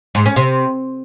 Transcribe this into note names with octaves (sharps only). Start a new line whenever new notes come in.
G#2
C#4
C3